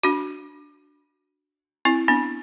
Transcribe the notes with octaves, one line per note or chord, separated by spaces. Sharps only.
D4 F#4
C4 E4
B3 D4